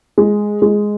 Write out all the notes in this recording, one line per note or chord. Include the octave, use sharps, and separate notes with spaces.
G#3
G#3